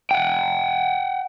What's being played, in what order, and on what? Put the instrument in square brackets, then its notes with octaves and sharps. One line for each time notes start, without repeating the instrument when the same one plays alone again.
[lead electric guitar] F#5 G5